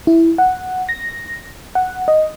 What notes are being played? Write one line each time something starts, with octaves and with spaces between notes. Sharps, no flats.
E4
F#5
A#6
F#5
D#5